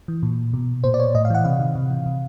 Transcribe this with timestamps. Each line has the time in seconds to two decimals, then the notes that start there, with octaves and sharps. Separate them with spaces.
0.08 E3
0.23 A#2
0.53 B2
0.84 A#2 C5
0.94 D5
1.00 C#5
1.15 A2 D#5
1.25 F5
1.30 E3 F#5
1.45 C3 F5
1.59 D#3
1.75 C3
1.90 E3
2.06 C3